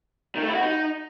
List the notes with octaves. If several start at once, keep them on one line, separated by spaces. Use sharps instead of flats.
D#3
A3
E4
F#4
D#4